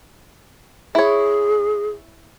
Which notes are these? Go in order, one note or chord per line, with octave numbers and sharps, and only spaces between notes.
E4 G#4 C#5